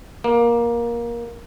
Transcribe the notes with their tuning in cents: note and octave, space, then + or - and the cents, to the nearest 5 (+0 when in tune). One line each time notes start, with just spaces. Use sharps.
A#3 +15